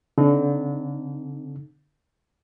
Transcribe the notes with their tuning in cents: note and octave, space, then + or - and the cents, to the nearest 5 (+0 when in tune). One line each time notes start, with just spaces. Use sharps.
D3 -30 C4 +0 D#4 -25